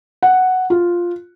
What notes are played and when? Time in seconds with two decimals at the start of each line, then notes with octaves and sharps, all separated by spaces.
0.23 F#5
0.70 F4